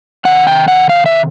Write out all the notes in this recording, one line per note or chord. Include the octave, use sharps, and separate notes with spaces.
C3 D#3 F#5
G5
F#5
F5
E5